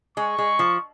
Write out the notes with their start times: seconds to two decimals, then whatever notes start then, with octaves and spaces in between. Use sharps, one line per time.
0.17 G#3 C#6
0.38 G#3
0.59 F3